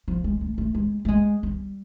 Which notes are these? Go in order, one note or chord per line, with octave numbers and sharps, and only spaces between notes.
F3
G#3
A3
A3
G#3
A3
G#3
G3